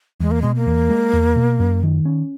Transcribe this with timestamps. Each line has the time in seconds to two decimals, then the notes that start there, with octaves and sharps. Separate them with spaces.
0.20 E2 G#3
0.31 A#3
0.42 B2 G#3
0.56 A#3
0.67 E2
0.90 G#3
1.13 E2
1.36 B2
1.60 F#2
1.83 D#3
2.05 C#4